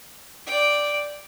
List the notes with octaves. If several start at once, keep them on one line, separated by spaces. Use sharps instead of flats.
D5 G5